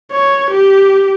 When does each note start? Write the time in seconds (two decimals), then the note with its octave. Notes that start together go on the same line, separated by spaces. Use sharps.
0.11 C#5
0.51 G4